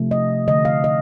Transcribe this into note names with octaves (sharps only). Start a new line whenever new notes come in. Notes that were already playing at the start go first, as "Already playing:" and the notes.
Already playing: C3 F3 A3
D#5
D3 A3 D#5
F5
D#5